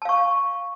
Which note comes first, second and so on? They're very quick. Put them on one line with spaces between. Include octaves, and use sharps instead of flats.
A5 F5 C#6